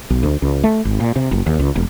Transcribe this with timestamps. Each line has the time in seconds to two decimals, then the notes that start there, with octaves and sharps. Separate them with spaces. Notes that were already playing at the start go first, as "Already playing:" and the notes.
0.10 B1
0.23 D2
0.42 C#2
0.64 A3
0.85 G#1
1.00 A#2
1.16 C3
1.31 F#1
1.46 D#2
1.59 C#2
1.76 E1